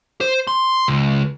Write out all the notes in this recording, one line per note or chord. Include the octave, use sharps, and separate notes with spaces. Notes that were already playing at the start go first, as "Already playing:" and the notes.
C5
C6
C#2